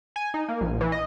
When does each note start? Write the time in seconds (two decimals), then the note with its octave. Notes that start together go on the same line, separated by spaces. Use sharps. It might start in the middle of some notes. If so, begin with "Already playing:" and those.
0.16 G#5
0.34 D#4
0.48 A#3
0.61 A#1
0.81 E3
0.92 D#5